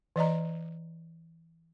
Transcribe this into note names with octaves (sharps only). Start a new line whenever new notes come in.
E3 D5 D#5 A#5